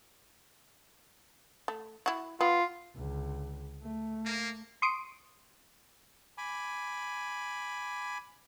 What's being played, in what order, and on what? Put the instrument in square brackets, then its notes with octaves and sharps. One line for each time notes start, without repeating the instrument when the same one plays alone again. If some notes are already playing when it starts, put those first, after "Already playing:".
[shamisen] A3
E4 F#4
[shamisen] B3 [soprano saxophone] F4
[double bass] C#2 D3
A3
[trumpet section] A#3
[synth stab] C6 C#6 D#6 D7
[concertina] G#5 B5 D6